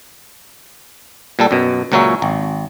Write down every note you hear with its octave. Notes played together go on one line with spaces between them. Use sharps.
A#2 G3 A4
F#2 B2
C#2 A#2 F#3 C#4 E5
G#1